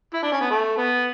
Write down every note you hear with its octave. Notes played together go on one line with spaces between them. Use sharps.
E4
D4
C#4
B3
A3
B3